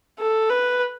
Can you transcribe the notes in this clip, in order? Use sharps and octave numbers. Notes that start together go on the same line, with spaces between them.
A4
B4